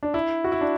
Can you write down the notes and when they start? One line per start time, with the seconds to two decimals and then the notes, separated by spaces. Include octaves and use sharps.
0.03 D4
0.14 E4
0.44 F#4
0.52 E4
0.61 D4